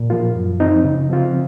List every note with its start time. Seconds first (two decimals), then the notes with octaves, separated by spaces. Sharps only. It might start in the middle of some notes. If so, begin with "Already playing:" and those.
Already playing: A#2
0.10 F3 A#3 F4
0.35 F#2
0.60 F3 C4 D#4
0.85 C#3
1.10 F3 C4 F4